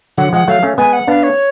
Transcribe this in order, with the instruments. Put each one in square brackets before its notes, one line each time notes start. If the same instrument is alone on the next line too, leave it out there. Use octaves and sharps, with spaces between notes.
[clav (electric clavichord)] D3 F#3 [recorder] F#5
[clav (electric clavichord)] F3 G#3 [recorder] F#5
[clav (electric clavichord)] F#3 A3 [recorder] F5
[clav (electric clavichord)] A3 C#4
[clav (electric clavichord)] G#3 B3 [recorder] G#5
[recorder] F#5
[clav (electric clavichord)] B3 D4 [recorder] F5
[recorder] C#5